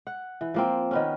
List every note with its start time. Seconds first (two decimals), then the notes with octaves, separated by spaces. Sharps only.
0.07 F#5
0.41 E3
0.54 F3 A#3 C4
0.91 D#3 B3 C#4